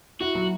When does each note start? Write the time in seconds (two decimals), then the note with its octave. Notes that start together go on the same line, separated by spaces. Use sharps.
0.21 E4 F#4
0.35 F#3